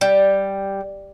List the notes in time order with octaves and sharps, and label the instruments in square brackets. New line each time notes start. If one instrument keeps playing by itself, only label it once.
[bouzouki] G3